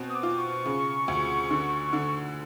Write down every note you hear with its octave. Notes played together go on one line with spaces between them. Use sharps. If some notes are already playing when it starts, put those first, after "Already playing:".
Already playing: B2 C4
D#6
D6
F4
C#6
C#3
D2
D3
D3